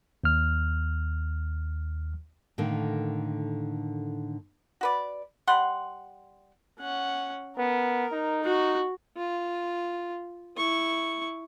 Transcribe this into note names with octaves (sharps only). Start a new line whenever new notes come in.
D#2 F6
A2 D3 D#3 A#3
F#4 B4 D5
G3 F#5 C6
C#4 F#5
B3 A#4
D#4
F#4
F4
E4 C#6